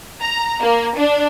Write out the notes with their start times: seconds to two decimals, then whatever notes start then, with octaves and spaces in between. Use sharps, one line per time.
0.21 A#5
0.61 A#3
0.96 D4